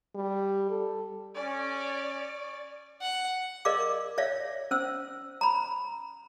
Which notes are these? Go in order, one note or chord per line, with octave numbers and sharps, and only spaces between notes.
G3
A4
C#4 D5
F#5
A#4 D5 D#5 F5 D6
C#5 D5 E5 F5
C#4 C5 E6
A#5 B5